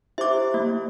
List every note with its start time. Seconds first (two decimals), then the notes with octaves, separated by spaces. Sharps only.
0.18 E4 G4 C5 E5 D6
0.54 A#3 E4